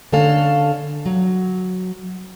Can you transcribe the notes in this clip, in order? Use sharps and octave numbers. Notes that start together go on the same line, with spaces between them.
D3 C#4 A4 F5
F#3